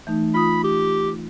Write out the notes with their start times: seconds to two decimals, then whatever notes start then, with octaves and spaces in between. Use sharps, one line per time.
0.07 E3 A3 D#4
0.34 F4 B5 D#6
0.64 G4